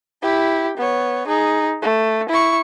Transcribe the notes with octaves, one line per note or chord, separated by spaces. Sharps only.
E4 G4
B3 C#5
D#4 G#4
A3
E4 C#6